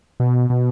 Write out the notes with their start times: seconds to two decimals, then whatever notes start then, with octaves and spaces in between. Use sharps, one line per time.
0.20 B2
0.50 B2